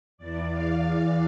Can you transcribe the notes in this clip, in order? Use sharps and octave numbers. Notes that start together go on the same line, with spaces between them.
E2 E3 D5
F5